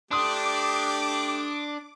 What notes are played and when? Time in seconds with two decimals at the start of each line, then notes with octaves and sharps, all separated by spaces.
0.11 A3 D4 G4 C6 D6 D#6